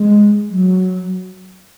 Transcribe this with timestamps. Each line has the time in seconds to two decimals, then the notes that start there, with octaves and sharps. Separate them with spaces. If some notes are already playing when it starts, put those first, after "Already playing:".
Already playing: G#3
0.50 F#3